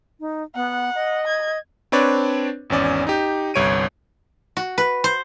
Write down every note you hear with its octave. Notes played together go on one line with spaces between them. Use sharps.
D#4
B3 F#5
D#5
G#6
C4 D4 B4 C#5 D5
G#1 E2 C#4 D5
D#4 G4
G1 C2 C#5 D7 D#7
F#4
B4
C5